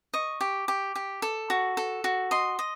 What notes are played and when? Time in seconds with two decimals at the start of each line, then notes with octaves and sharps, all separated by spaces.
0.14 D#5 C#6
0.41 G4
0.68 G4
0.95 G4
1.22 A4
1.50 F#4
1.77 A4
2.04 F#4
2.31 D#5 C6
2.59 D#5